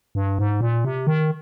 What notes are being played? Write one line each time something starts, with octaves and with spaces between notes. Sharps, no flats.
G2
G#2
A#2
C3
D#3